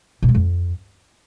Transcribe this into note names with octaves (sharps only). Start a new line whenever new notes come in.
B2
G#3
F2